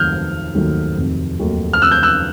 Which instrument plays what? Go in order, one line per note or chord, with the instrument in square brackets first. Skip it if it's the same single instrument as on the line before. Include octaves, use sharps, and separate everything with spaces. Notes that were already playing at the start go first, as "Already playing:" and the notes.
Already playing: [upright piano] F1 D#2 D#3 F#3 A3 [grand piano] F6 G6
[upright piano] F1
D#2 D#3 F#3 A3
F1
D#2 D#3 F#3 A3
[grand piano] F6
[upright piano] F1 [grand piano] E6 F#6
[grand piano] G6
E6 F#6